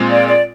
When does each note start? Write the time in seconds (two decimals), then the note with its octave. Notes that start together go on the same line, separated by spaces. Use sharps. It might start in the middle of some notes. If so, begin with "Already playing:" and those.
Already playing: A#2 G#3 C4 F4
0.10 D5
0.27 D5